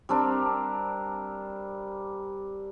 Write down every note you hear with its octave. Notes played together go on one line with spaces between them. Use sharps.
G3 C4 D4 A#4